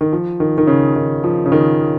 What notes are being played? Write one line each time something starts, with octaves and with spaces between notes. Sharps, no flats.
D#3
F3
D#3
D#3
C#3
D#3
F3
C#3
D#3